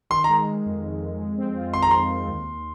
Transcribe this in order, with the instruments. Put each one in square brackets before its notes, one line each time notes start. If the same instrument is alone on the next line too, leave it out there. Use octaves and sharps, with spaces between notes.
[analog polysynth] D#3 [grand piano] C6
[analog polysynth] G#3 [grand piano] A#5
[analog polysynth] G#3
F2
F2
F2
G#3
C4
F4
[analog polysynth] D#3 [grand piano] C6
[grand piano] A#5
[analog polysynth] G#3 [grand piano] C6
[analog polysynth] D#3
D#2
D#2